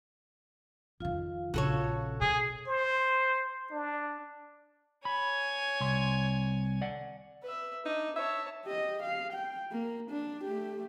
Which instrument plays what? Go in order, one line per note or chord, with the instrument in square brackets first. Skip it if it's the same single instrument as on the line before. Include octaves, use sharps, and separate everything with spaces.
[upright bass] F2 D#3 [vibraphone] F4 F5
[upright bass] A#1 C#3 [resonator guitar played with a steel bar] F#4 A4 C#5
[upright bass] B2 [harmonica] G#4
[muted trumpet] C5
D4
[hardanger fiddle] C#5 G#5 [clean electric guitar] B5
[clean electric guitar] C2 C6
D5 F#5
[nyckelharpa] B4 E5
[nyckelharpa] D4 [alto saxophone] D#4
[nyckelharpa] C#5 A5 [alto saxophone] E5
[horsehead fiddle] G4 D#5
F5
G5
A#3
D4
A3 G4